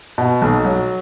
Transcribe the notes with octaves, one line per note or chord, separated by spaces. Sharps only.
B2
B1
F#3